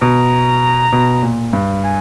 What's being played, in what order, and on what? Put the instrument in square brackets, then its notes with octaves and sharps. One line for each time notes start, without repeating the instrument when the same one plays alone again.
[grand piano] B2 [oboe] A#5
[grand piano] B2
A#2
G2
[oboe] G#5